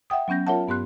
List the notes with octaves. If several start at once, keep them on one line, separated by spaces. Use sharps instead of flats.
E5 F#5 G5 D#6
F#3 B3 C#4 G6 A#6
F4 A#4 C#5 E5 F#5 A5
G2 B3 G4 C6 F#6